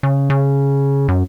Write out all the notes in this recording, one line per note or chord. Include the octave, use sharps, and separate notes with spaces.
C#3
C#3
F#2